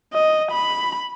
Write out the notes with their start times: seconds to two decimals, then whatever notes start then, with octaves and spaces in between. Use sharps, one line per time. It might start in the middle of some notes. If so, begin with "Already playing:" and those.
0.13 D#5
0.51 B5